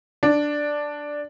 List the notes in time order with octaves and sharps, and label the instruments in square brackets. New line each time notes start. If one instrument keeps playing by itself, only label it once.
[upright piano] D4